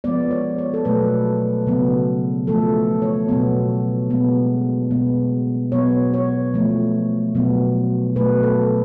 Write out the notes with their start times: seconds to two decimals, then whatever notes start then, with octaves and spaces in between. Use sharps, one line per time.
0.04 F3 G#3 B3 D5
0.31 C#5
0.58 C#5
0.74 A4
0.85 B2 F#3 A3 B4
1.67 C#3 F#3 B3
2.47 F3 A3 A4
3.02 C#5
3.29 B2 F#3 B3
4.10 B2 G#3 B3
4.91 B2 G#3 B3
5.72 B2 F#3 B3 C#5
6.14 C#5
6.54 F3 A3
7.35 B2 F#3 B3
8.16 B2 F#3 A3 B4
8.43 A4